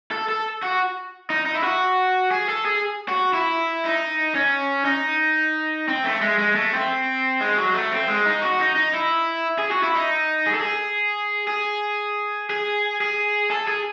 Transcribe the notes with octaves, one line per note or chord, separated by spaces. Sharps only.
A4
A4
F#4
D#4
D#4
E4
F#4
G#4
A4
G#4
F#4
E4
D#4
C#4
D#4
C4
A3
G#3
G#3
A3
C4
G#3
F#3
A3
C4
G#3
D#4
F#4
D#4
D#4
E4
G#4
F#4
E4
D#4
G#4
A4
G#4
G#4
G#4
G#4
A4
G#4